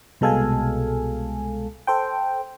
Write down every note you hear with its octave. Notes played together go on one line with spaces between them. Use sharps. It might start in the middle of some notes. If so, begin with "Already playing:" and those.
C2 B2 G#3 A4 F5 G#5
A4 C5 G5